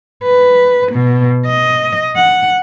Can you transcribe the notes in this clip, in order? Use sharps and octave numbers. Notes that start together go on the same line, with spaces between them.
B4
B2
D#5
F#5